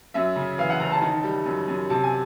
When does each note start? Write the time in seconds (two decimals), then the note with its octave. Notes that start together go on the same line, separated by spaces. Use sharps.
0.14 F#2 E5
0.36 C#3
0.58 E3 F5
0.70 F#5
0.80 F#1 A#5
0.92 A5
1.01 D#3
1.24 G3
1.45 F#2
1.68 F#2
1.90 C3 A5
2.03 G#5